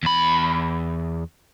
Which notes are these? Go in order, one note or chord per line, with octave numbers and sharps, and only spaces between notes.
E2 B5